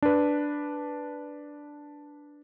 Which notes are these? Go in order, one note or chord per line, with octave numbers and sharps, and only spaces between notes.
D4 B4